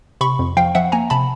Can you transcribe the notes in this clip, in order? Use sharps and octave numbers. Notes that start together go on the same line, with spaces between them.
C3 B5 C#6
F2
F3 F5 G5
F3 E5 F#5
A#3 G#5 A#5
C3 A5 B5